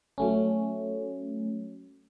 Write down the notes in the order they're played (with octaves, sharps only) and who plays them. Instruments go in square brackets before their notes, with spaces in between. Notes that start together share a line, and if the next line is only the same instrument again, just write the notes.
[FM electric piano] F#3 A3 C#4